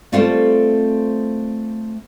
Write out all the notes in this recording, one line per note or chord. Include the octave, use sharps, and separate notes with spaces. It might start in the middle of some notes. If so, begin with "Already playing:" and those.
G3 A3 C4 F4 A4 C5